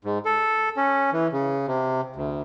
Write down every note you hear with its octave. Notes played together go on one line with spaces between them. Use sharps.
G#2
A4
C#4
E3
C#3
C3
D2